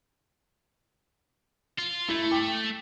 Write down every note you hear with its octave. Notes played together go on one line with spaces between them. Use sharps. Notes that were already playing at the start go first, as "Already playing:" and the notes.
F4
A3 E4
G5 D6